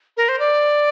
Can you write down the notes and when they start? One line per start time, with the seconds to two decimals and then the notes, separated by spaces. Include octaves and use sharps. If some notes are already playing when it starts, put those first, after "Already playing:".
0.17 A#4
0.29 C5
0.39 D5